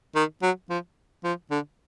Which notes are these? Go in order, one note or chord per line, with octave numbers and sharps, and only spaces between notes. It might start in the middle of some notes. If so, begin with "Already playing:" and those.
D#3
F#3
F3
F3
D3